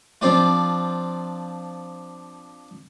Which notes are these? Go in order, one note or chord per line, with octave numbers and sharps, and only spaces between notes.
F3 C4 D4 F4